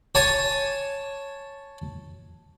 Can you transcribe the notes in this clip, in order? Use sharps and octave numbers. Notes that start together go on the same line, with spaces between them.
C#5 G#5 A5 C#6